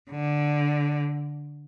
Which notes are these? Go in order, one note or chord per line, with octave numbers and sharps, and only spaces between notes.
D3